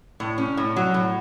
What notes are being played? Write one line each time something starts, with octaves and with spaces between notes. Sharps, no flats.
A2
C#4
A2
F#3
A2